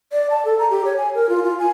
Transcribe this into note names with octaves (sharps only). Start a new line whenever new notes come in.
D5
A5
A4
A#5
G4
C#5
G#5
A#4
F4
F4
G#5